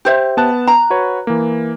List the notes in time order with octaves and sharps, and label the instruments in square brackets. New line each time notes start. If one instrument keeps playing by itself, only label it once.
[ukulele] G4 C5 E5
[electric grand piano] B3 A5 F#6
[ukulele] A#5
[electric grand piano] F#4 B4 C#5
E3 A#3